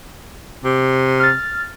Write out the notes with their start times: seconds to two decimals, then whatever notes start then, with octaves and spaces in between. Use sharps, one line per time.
0.64 C3
1.20 F6 A6